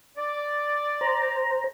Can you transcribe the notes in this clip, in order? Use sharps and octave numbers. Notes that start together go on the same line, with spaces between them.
D5
C5 A#5